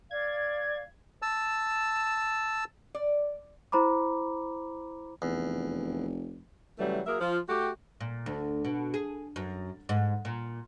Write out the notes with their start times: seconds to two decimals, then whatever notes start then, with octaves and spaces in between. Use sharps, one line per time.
0.11 D5 F5 G#6
1.22 A5 E6
2.95 D5
3.72 E4 C5 A#5 B5 D6
5.22 F1 E2
6.79 C#3 E3 F#3 G3 A3
7.07 F#3 A#3 G#4 A#4 E5
7.21 F3 F4
7.48 A3 F#4 G4
8.01 A#2
8.26 D2
8.65 B2
8.94 G#4
9.36 F#2
9.89 G#2
10.25 A#2